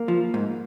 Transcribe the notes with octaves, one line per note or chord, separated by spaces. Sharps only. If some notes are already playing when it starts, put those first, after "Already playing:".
Already playing: A#3
F3
G#2